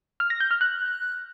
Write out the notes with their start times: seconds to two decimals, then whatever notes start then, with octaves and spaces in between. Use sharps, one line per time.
0.20 F6
0.30 A#6
0.40 G6
0.51 F6
0.61 F#6